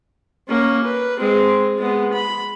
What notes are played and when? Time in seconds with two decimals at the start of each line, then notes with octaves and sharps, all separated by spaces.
0.48 A#3 C#4
0.84 B4
1.20 G#3 C4
1.79 G#3 B3
2.13 B5